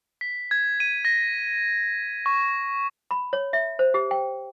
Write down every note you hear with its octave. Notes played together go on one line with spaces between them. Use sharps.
B6
G#6
D#7
A#6
C#6
B5
C#5
E5
C5
G4
G5